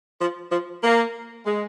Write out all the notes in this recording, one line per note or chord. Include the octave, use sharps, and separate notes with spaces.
F3
F3
A#3
G#3